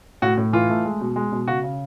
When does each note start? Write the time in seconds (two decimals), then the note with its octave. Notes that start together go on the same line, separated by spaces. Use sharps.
0.22 A2 F#4
0.37 A2
0.53 E3 F4
0.70 A3
0.85 G#3
1.01 B2
1.16 G#3
1.32 B2
1.47 C#3 F#4
1.63 C#3